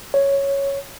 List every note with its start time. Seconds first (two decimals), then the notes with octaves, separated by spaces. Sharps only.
0.14 C#5